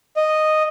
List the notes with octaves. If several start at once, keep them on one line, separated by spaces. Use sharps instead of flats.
D#5